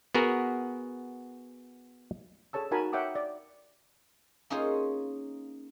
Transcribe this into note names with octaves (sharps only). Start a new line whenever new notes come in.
B3 F#4 G#4 A#4
G#4 A4 C#5 A5 E6
D#4 F#4 A#4 G#5 A5 B5
C#5 E5 F#5 G5 D6 D#6
D5
A#3 C#4 D#4 F4 G#4 C5